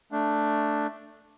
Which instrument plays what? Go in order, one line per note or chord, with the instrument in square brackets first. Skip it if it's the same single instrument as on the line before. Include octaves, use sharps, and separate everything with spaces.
[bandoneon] A3 D4